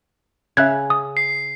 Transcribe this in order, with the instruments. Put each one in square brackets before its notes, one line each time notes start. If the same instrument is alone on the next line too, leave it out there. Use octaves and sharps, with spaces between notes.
[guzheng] C#3 [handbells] E5 F#6 G#6
[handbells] D#6
[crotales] C7